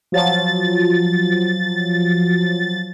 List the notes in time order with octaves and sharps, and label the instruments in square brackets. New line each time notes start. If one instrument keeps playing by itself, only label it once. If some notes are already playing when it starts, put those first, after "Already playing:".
[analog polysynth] F3 F#3 A6